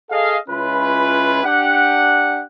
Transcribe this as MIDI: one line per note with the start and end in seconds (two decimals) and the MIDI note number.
0.10 0.36 68
0.10 0.36 69
0.10 0.36 75
0.10 0.36 77
0.49 1.41 37
0.49 1.41 61
0.49 1.41 64
0.49 1.41 65
0.49 1.41 71
1.44 2.41 62
1.44 2.41 67
1.44 2.41 78